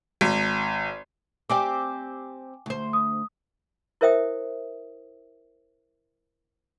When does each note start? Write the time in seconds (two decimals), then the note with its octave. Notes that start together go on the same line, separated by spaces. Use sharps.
0.21 G#1
1.50 C4 G4 D5 G5 G#5 D6
2.66 D2 C5
2.93 D#6
4.01 E4 A#4 C5 E5 G5 D#6